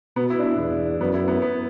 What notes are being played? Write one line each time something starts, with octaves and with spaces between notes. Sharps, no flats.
B2 B3
E4
D4
E4
E2
F#2 B3
E4
B3
B3